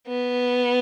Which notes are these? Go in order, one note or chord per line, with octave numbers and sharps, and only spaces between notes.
B3